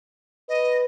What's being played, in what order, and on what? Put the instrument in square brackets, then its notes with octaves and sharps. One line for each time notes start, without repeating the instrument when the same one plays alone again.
[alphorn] B4 [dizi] D#5